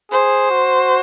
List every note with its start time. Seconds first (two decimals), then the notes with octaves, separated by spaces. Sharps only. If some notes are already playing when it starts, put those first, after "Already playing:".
0.11 G#4 C5
0.51 F#4